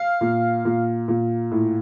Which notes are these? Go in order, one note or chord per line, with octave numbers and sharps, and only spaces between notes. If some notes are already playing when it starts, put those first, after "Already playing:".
Already playing: F5
A#2
A#2
A#2
A2